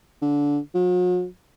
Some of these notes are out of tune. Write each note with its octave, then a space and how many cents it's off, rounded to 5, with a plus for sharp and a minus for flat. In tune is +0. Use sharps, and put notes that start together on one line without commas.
D3 -20
F#3 -45